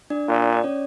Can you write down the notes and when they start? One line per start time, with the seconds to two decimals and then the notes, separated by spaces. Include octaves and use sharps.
0.10 D4 D5
0.28 A#2
0.53 D5
0.64 C#4 C#5